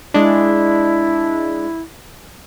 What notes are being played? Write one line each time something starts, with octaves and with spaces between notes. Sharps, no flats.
G#3 D4 E4